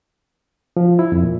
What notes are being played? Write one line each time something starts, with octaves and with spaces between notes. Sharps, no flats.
F3
E4
F2
A#2